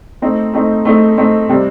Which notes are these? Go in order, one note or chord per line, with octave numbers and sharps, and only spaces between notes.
A3 C4 D#4
A3 C4 D#4
A3 C4 D#4
A3 C4 D#4
C3 G3 C4